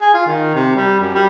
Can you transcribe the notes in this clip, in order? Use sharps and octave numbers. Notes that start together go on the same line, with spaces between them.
G#4
F4
D#3
C3
G3
F#2
G3